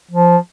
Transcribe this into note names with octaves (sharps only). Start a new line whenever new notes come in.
F3